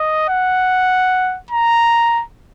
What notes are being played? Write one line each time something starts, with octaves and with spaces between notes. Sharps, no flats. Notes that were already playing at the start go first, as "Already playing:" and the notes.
Already playing: D#5
F#5
A#5